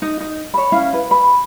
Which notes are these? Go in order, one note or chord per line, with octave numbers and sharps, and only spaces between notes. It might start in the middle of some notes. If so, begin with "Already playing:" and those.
D#4
D#4
C#5 B5
C#4 E4 F5
B4
B5